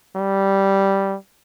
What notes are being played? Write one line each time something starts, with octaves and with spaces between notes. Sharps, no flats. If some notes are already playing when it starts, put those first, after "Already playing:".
G3